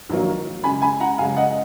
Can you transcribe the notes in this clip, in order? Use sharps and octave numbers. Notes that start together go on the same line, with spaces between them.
A#1 G#2 D#3 F#3 A#3
F#2 C#3 G#3 G#5 B5
G#5 B5
F#5 A#5
F#2 C#3 G#3 F5 G#5
D#5 F#5